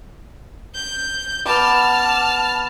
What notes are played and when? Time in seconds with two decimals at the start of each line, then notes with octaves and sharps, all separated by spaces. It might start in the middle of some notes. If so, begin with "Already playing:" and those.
0.75 G6
1.46 B3 A5 D6 F6